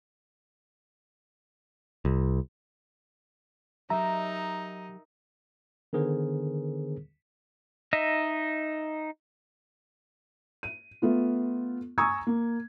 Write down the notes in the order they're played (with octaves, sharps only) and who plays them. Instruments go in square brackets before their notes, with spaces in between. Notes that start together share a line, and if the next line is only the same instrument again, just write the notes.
[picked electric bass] C2
[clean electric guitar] F#3 G4 D#5 [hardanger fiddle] D#4 [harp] A#4 E5 [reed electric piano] A#5
[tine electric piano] D3 D#3 B3 G#4 A#4 C5
[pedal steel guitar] D#4 D#5 E5
[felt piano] D#7
A3 B3 F4
G#5 A#5 C#6 D#6 E6 G#6
A#3